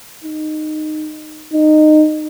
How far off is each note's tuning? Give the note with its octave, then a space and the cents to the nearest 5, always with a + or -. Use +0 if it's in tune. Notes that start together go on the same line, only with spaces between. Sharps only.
D#4 -15
D#4 -20